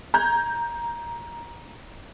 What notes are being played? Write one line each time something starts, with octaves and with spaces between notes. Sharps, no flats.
A#5 G6 G#6